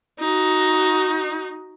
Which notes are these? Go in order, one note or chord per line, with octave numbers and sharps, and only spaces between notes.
D#4 F#4